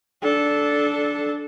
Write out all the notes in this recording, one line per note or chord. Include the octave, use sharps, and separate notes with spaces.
D4 A4